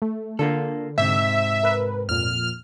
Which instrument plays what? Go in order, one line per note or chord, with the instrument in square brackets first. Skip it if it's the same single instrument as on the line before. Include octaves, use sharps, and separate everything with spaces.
[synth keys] A3
[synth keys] D3 [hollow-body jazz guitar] A#3 F4 A4
[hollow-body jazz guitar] G#2 C3 [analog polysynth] E5
[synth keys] A#4 B4
[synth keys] F2 A#2 [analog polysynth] F6